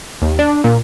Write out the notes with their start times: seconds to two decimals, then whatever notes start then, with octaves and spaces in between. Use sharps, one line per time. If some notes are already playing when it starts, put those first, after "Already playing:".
0.22 D#2
0.39 D4
0.64 A#2